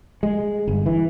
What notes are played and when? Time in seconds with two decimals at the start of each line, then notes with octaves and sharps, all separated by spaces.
0.23 G#3
0.68 G1
0.86 E3